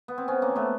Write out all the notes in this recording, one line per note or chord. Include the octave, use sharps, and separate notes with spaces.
B3
C4
C#3 B3 C#4
A#3 C4
F#3
A3 B3